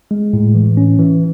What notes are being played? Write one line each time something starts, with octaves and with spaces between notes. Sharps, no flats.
G#3
A2
E3
C#4
E3